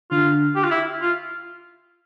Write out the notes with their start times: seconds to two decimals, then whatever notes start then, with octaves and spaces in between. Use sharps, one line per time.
0.11 D3 F4
0.56 G4
0.64 F4
0.71 E4
1.02 F4